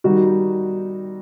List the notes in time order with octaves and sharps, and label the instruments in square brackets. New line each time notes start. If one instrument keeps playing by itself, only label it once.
[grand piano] D#3 G3 D#4 F#4